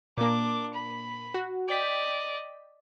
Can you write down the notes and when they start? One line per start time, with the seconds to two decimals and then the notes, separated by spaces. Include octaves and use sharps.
0.18 A#2 A#3 D4 D6
0.73 B5
1.34 F#4
1.68 D5 D#5 G5 B6